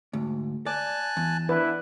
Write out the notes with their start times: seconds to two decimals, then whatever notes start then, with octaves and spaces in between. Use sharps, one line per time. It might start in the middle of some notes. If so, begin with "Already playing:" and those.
0.13 D2 G#2
0.66 D5 G#5 A5 F#6
1.17 E2
1.49 B3 D4 E4 B4